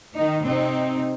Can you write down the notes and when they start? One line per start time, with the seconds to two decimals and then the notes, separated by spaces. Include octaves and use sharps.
0.15 D#3 D#4
0.44 C3 C4 D#4